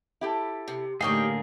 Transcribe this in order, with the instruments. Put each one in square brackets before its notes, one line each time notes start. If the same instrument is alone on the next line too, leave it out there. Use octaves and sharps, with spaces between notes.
[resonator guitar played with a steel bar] E4 G4 A4
[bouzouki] C3
[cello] A2 D3 [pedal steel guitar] A#3 G#4 [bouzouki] D#4 G4 C#5 [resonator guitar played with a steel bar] F5